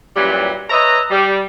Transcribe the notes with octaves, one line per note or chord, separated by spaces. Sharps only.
F#2 A#2 E3 F#3 G3
B4 C#5 D#5 E5 A#5
G3